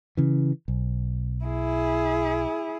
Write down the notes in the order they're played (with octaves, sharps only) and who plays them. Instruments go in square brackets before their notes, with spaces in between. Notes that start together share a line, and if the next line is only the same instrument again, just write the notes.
[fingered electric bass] C#3 E3
B1
[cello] E4 G#4